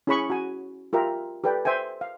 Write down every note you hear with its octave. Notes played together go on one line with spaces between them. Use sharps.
C#4 E4 G#4 C#5 B5 C#6
F#4 G#5
F4 G4 A#4 E5
G4 A4 B4 D5 G5
C5 E5 G5 G#5
F5